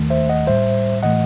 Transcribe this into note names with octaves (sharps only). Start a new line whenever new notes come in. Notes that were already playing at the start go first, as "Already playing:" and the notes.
Already playing: D#2 D#3 A3
C5 E5
D#5 F#5
A2 G3 C5 E5
A2 E3 A3 D#5 F#5